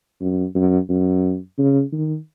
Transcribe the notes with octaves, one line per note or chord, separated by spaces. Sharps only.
F#2
F#2
F#2
C#3
D#3